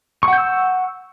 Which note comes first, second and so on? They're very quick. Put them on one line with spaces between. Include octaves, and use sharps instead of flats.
C#6 F#5 G6 E6